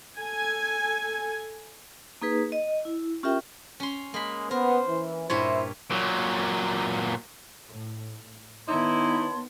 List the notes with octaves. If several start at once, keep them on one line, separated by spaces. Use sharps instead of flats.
A4 G#5
A#3 D#4 G#4 B4
D#5
E4
C#4 F4 G4 A#4 E5 G5
C#4 C6
G#3 A#3 B5
B3 A#4 C5
E3
G2 A#2 E4 C5 C#5
A#2 F#3
A2
D#3 B3 D#4 E4 C#5 A5 C6